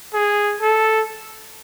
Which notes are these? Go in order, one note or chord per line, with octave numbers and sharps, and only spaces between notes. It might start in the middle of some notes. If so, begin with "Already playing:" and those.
G#4
A4